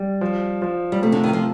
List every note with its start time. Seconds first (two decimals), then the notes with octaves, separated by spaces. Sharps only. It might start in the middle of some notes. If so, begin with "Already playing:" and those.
Already playing: G3
0.21 F3
0.62 F3
0.92 G3
1.02 C3 A3
1.12 D3
1.24 D#3
1.33 F3